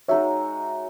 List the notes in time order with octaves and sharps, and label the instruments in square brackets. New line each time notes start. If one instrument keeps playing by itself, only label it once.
[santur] G#3 D#4 F#4 [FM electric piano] C#5 E5